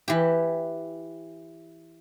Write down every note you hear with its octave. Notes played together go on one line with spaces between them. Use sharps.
E3 G4